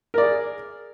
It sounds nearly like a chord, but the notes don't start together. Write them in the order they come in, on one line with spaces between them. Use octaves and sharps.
A#4 D5 G#4